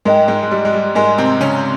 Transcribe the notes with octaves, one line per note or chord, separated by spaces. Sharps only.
G#2 G#3 A#4 D#5 G5
G#2 G#3
G#3
G3
G#3
G3
G#2 G#3 A#4 D#5 G#5 C6
C3 C4
C#3 C#4